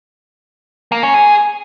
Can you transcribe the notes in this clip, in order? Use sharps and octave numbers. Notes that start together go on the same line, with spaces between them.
A#3
C#4
G#4